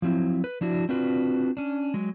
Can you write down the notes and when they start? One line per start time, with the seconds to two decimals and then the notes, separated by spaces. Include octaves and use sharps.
0.02 F3 F#3 C4 E4
0.44 B4
0.61 F3 D4 E4 F#4
0.89 C4 D4 F4 F#4 B4
1.57 C#4 D4
1.94 F#3 G#3